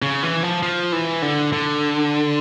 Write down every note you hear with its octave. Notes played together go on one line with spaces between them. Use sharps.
C#3
E3
F3
F3
E3
D3
D3